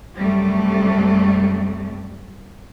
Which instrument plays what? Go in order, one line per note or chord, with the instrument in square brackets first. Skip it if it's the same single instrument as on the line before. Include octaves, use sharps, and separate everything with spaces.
[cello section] F#2 C3 G3 A3